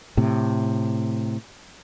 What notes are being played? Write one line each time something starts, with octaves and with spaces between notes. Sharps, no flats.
A2 C3